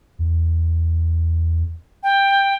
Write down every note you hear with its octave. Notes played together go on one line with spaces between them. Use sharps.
E2
G5